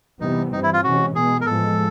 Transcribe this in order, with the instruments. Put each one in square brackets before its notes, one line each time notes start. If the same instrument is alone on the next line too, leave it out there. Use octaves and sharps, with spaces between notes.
[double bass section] C3 E3 G3 B3 [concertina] D#4
[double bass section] G2 E3 G3 C4 [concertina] D#4
[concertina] E4
F4
[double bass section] C3 E3 G#3 C#4 [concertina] F#4
[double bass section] B2 G#3 B3 [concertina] G#4
[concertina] A#4
[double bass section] A2 F3 G#3 [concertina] A4